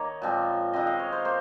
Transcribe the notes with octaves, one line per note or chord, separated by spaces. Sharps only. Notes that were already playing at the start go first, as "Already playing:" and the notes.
Already playing: D#3 A#3 C#5
A#2 F3 G#3 C4
D#3 G#3 C4 D#5
F5
C#5
C5
A#3 C5